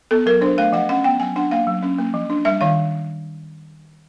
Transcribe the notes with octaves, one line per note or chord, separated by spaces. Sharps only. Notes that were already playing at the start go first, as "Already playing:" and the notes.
B3 A4
F#3 A#4
D4 C5
A3 F5
F3 F#5
C#4 F#5
B3 G5
F#3 G#5
D4 F#5
A#3 F5
F#3
C#4
A#3
F3
D4
G3 E5
D#3 F5